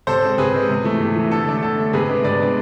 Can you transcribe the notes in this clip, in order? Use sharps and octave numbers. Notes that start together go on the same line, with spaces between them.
C3 A4 C5
G#3 C4
C3 G#4 B4
G#3 C4
C3
E3 A3
C3
E3 A3
D3 A4
A3 D4
D3 A4
A3 D4
C3 G#4 B4
G#3 B3 D4
C3 B4 D5
G#3 B3 D4